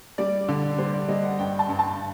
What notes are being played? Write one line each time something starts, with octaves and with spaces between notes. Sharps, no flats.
G3 D5
D3
G3 C5
D5
G3 D#5
F#5
G2 G5
A5
G2
A5